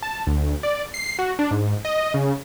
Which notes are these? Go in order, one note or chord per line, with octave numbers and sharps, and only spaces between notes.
A5
D2
D5
C7
F#4
D4
G#2
D#5
C#3